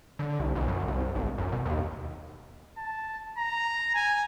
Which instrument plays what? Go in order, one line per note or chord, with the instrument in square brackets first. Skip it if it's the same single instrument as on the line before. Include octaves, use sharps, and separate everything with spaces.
[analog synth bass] D3
C2
B1
F#2
C2
G#1
F#2
B2
D#2
[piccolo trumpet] A5
A#5
G#5